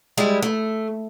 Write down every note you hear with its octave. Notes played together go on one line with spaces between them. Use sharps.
G3 G#3 E4
A3